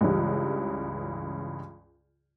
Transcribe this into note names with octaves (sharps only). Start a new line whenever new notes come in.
C#2 G2 C#3 E3 G3